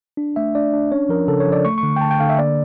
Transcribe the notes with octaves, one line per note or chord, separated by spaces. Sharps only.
D4
A3 E5
D4 D5
D4
C#4 C#5
F3 A#4
C#3 A4
C#5
F3
D5
A3 C#6
C#6
D3
G5
D3 A5
G5
D3 F5
E5
A#3 D5